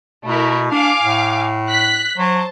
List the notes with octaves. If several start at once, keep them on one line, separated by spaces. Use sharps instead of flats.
B2 A3 E4 A#4
D4 F5 G#5 D6
A2
F#6 B6
F#3 C5 A5